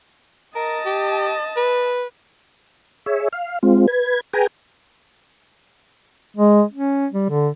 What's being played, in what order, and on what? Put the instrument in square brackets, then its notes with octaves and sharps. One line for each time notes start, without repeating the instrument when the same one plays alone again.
[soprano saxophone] A#4 [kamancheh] D#5 A5
[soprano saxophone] G4
B4
[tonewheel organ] G#4 C#5 E5
F5
G#3 C4 F4
B4 G#6
G#4 B4 G5 G#5 A#5
[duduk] G#3
C#4
G3
D3